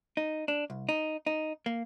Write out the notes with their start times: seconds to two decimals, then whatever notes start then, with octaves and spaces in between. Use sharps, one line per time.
0.17 D#4
0.48 D4
0.70 C2
0.89 D#4
1.26 D#4
1.66 A#3